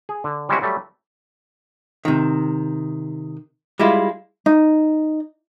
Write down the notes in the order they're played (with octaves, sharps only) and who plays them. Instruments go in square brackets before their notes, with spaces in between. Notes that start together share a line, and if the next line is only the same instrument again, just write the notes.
[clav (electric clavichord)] G#4
D3
G3 G#3 C4 C#4 E4 F#4
F#3 G3 A3
[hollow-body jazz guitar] C3 D#3
G3 G#3 E4 F4
[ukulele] D#4